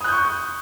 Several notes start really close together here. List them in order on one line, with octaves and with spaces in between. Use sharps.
D#6 F#6 G6 C#6